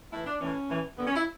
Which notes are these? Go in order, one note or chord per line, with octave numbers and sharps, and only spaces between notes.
A2 E3 E4
D4
A2 E3 C#4
A2 E3
G2 D3 B3
C#4
E4